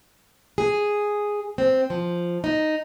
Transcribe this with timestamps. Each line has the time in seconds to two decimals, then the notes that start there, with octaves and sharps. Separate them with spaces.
0.58 G#4
1.58 C4
1.90 F3
2.44 D#4